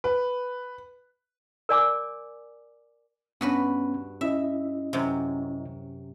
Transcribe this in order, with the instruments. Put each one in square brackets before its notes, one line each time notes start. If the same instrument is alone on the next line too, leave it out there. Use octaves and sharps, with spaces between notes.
[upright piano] B4
[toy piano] A#4 D5 G#5 D6
[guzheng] G2 F#4 B4 [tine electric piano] B3 C#4
[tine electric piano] C#4 E4 D#5 [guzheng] E5
[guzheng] F#2 C3